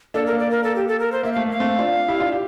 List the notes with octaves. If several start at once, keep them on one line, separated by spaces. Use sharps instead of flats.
A#3 D4 A4
A#4
A#3
D5
A#4
A4
G4
A4
A#4
C5
A#3 E5
A3 F5
A#3 F5
A3 C4
D4 F4
E4 G4
D4 F4
G4